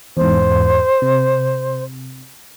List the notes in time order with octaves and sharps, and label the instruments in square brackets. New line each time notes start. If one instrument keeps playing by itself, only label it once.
[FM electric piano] E2 G#2 [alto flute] C5
[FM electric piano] C3